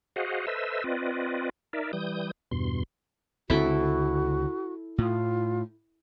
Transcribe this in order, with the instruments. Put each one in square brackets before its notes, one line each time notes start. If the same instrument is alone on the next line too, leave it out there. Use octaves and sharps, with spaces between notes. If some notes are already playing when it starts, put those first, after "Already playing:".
[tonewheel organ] F#4 G#4 C5 D#5 F5 F#5
A4 B4 C5 D#5 E5 E6
C4 F4 B4 D5 D#5
D#4 A#4 D5 E5
E3 G3 D#6 G6
E2 G2 B2 C6
[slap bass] C#2 D3 C4 [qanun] E4 A4 [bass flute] F#4
[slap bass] A2 [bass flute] F4